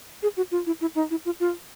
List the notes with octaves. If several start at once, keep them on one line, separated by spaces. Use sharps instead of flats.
G#4
F#4
F4
E4
E4
D#4
E4
F4
F4